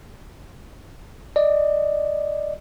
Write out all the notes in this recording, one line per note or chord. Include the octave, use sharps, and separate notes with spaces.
D5 D#5